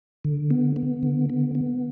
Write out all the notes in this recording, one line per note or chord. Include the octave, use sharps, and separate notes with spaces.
D3
B3
B3
D3
B3
B3